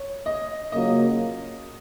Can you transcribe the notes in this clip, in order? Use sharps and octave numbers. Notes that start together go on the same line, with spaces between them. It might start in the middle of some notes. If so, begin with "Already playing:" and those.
Already playing: C#5
D#5
C#3 F#3 A#3 F4 D#5